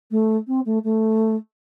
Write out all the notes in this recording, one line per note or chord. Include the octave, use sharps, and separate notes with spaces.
A3
C4
A3
A3